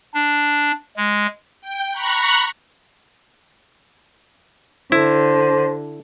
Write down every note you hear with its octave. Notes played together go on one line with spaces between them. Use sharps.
D4
G#3
G5
A#5 B5 C#6 F#6
D3 E4 C5